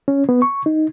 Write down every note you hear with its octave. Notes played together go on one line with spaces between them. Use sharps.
C#4
B3
C#6
D#4